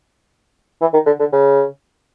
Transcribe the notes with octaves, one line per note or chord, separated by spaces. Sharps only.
E3
D#3
D3
D3
C#3